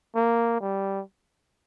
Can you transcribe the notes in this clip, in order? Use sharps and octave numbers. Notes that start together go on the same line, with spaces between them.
A#3
G3